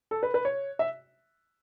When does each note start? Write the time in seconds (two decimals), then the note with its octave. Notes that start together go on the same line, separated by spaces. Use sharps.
0.11 A4
0.23 B4
0.34 B4
0.45 C#5
0.79 E5